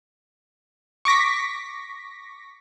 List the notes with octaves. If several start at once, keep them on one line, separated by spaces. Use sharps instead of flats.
C#6 D6 A#6 B6